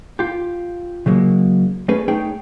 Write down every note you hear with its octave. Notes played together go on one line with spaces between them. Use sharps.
F4 G4
C#3 F#3 G#3 A#3
G#3 A3 C#4 G#4 B4
A3 D#4 G#4 C#5 G5